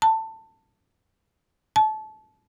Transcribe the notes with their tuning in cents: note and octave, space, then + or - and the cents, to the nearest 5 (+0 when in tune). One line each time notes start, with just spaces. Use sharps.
A5 +15
A5 -25